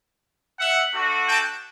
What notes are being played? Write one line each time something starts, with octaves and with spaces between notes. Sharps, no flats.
E5 F#5
A3 D4 F#4
G5 A5